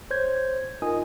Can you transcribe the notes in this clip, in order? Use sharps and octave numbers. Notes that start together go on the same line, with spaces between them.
C5 C#5 G6 G#6
D#4 F4 A#4 D#5 G#5 D#6